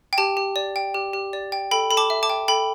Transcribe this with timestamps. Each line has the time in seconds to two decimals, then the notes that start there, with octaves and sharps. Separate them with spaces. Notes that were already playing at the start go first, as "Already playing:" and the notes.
0.13 G5
0.18 G4 A5
0.37 G4
0.56 D5
0.76 G5
0.94 G4
1.13 G4
1.33 D5
1.52 G5
1.71 A4 G5 B5
1.91 A4 B5
1.97 A5 D6
2.10 E5
2.23 A5 D6
2.30 G5
2.48 A4 G5 B5